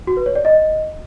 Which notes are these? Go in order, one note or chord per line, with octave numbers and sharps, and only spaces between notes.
F#4
B4
C#5
D5
D#5